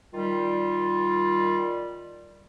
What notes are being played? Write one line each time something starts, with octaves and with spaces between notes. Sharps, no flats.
D#3 G3 F4